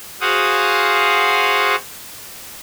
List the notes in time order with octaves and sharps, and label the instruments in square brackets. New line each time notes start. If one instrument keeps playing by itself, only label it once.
[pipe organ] F#4 G#4 C5 F5 F#5 D#6